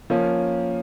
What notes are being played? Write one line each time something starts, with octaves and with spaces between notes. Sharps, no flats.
F3 A#3 C#4